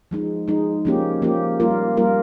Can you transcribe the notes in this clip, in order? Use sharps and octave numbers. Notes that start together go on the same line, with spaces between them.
F3 G#3 D#4
F3 G#3 D#4
F3 A#3 C#4 G4
F3 A#3 C#4 G4
G3 A#3 F4 A#4
G3 A#3 F4 A#4